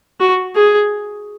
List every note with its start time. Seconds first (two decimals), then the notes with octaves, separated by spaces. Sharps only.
0.20 F#4
0.56 G#4